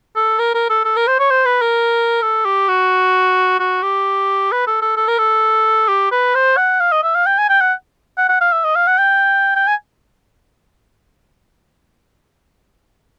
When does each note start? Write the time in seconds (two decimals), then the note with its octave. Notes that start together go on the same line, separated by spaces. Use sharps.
0.16 A4
0.39 A#4
0.55 A#4
0.70 A4
0.85 A4
0.97 A#4
1.07 C5
1.19 C#5
1.30 C5
1.46 B4
1.62 A#4
2.22 A4
2.45 G4
2.68 F#4
3.60 F#4
3.83 G4
4.52 B4
4.67 A4
4.82 A4
4.97 A4
5.08 A#4
5.18 A4
5.89 G4
6.12 B4
6.35 C5
6.57 F#5
6.80 F5
6.92 D#5
7.04 E5
7.15 F5
7.27 G5
7.38 G#5
7.49 G5
7.61 F#5
8.18 F#5
8.29 F#5
8.41 F5
8.52 E5
8.64 D#5
8.76 F5
8.87 F#5
8.99 G5
9.56 G5
9.67 G#5